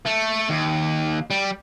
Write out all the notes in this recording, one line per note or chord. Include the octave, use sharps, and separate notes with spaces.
A3
D#2
G3